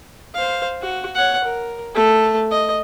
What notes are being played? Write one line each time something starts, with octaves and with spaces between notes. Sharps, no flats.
C5 F5
F#4
C#5 F#5
A#4
A3 A4
D#5